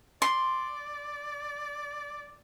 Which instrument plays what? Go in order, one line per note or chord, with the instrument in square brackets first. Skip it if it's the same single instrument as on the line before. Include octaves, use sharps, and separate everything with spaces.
[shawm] D5 [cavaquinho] C6